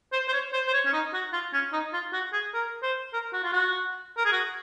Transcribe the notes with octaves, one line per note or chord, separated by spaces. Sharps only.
C5
C5
C#5
C5
C5
C#5
C#4
D#4
F#4
F4
C#4
D#4
F4
F#4
G#4
A#4
C5
A#4
F#4
F4
F#4
A#4
G#4
F#4